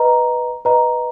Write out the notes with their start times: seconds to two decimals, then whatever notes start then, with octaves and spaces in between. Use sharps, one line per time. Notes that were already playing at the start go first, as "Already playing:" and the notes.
Already playing: B4 D#5 A#5
0.65 B4 D#5 A#5